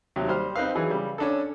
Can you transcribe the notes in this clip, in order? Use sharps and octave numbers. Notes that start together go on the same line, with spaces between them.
D#2 C3 F#3
G3 C5 F6
C4 D#4 B4 F5
E3 F#3 G#4
C#3 G3
C#4 D4 A4